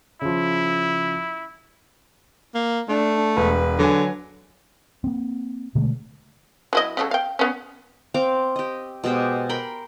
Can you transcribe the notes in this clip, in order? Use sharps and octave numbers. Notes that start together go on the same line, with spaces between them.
C#3 F3 E4
A#3
A3 D4
E1 B4
D3 F#3 G#5
A#3 C4
B2 D3 G#3 A3
F#3 E4 D#5
C#3 F#3 A4
F5 G5
B3 C#4
C4 F5 D6
G4 D#5
B2 G#3 G4 C5
A#4 G5 B5 C6